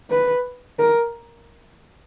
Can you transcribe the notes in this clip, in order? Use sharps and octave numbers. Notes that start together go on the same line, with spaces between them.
B4
A#4